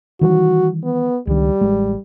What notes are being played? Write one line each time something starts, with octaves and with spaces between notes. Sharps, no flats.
D#3 E3 G3 F#4
B3
C#2 D#3 G3
A1 G#3